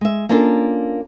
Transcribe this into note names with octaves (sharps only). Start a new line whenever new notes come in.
G#3 E5
A#3 C#4 D4 F4 A4 A#4